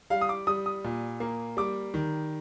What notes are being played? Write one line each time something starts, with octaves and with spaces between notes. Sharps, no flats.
G3 F5
D#6
D6
G3 D#6
D#6
A#2
A#3
G3 D6
D#3